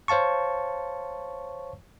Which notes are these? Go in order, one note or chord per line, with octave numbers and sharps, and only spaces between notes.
C5 C#5 F5 A5 C#6